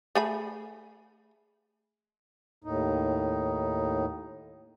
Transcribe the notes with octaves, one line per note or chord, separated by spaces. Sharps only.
A3 G#4 B5
D#2 A2 D#4